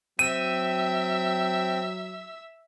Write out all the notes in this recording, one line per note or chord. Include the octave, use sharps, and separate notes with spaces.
F#3 C4 E5 G5 E6 D#7